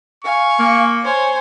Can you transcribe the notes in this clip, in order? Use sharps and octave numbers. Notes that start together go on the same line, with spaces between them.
F5 G#5 C#6
A#3
C5 C#5 G#5